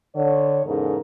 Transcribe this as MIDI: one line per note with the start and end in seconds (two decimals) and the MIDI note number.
0.16 0.61 50
0.16 0.61 73
0.66 0.97 40
0.66 0.97 44
0.66 0.97 49
0.66 0.97 63
0.66 0.97 69
0.66 0.97 70